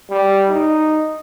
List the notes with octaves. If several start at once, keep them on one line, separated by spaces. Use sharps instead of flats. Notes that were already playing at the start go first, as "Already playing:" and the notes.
G3
D#4